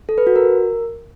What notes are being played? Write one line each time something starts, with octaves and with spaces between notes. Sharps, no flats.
A4
B4
F#4
A#4